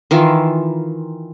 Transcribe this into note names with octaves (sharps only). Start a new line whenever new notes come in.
D#3 E3 F4